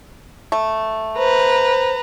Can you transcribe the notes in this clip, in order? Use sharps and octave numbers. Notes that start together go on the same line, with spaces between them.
A3
B4 C5 A#5